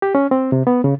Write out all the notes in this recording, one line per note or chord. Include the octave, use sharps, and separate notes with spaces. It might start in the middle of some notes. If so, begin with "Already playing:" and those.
G4
C#4
C4
C3
B3
C#3